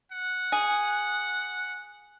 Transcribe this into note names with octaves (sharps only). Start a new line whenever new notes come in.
F#5
G#4